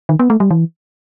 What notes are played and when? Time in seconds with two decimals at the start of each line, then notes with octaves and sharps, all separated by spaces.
0.09 D#3
0.19 B3
0.30 A3
0.40 G3
0.51 E3